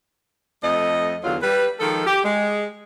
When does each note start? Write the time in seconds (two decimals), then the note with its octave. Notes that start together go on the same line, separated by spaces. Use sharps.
0.64 F2 A3 D#5
1.24 E2 D3 F#3 F4 F5
1.43 G3 B4
1.80 D#3 F3 G#3 A4
2.06 G4
2.23 G#3